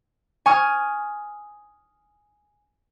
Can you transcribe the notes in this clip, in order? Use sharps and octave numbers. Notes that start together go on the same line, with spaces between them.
G#5 C#6 D#6 F6